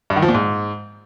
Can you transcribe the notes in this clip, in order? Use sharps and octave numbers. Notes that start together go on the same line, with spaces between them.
G2
D#3
F3
A#2
G#2